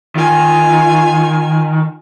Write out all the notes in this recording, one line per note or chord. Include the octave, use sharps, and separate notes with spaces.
D#3 F4 G#5